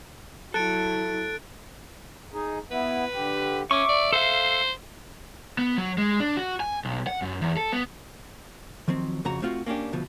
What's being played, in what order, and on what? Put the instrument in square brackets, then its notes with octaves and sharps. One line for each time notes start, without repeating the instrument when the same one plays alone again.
[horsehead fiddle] F#3 E4 [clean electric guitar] A4 [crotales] F#6 A6 D7
[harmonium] D#4 G#4
[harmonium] B3 E4 [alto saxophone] B4
[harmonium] D3 G4
[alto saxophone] C#4 [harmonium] E5 [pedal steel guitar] C#6 D6
[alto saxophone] D5
[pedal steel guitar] A4 F5 [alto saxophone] C5
[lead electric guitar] B3
F#3
G#3
D4
F#4
G#5
B1
F#5
F#2
E2
A4
B3
[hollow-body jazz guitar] D#3 F3 F#3 C4
F2 C#3 F#4 A#5
A3 C4 F4 F#4
A#3 C#4 D4 G4
D2 B2 F3